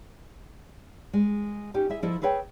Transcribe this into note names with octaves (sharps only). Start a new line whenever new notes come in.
G#3
C#4 D#4 G4
E4 G#4 E5
F3 E4 A4 D#5
G#4 A4 B4 C#5 G5